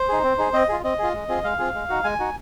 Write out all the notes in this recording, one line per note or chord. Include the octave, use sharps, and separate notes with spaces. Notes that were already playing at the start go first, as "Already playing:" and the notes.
Already playing: C5
D#4 G#4
C4
D#4 G#4
C4 D#5
F4 G#4
C4 D#5
F4 G#4
G#3
C4 F4 G#4
G#3 F5
C4 F4 G#4
G#3
D#4 F#4
G#3 G#5
D#4 F#4